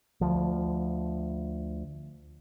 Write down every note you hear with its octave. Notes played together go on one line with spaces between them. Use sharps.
D2 F3